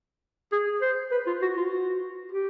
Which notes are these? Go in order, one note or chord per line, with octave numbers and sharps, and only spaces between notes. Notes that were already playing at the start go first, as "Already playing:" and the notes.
G#4
C5
B4
F4
F#4
F4
F#4
G4